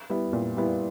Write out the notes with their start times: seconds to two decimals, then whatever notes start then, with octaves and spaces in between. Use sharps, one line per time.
0.10 G3 B3 E4
0.33 A#2
0.57 G3 B3 E4